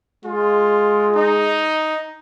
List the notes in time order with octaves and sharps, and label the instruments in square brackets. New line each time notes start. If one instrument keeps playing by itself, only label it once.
[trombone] G#3 [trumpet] F4
[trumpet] D#4